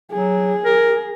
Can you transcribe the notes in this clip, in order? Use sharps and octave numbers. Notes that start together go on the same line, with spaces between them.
F#3 G#4
A#4